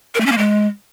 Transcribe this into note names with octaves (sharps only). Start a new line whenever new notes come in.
A#4
A3
C#4
A#3
G#3